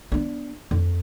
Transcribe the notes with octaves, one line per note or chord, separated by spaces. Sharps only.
B3 D4
F2